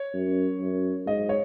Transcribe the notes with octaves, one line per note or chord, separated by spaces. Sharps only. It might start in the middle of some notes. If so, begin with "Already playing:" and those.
Already playing: C#5
F#2
F#2
G#2 D#5
C#5